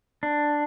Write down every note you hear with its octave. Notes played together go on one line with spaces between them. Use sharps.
D4